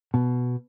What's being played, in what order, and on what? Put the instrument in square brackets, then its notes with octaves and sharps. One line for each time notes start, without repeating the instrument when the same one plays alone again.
[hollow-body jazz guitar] B2